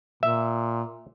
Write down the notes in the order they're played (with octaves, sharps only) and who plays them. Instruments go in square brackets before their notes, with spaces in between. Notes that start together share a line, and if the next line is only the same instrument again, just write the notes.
[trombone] A#2 [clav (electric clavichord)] E5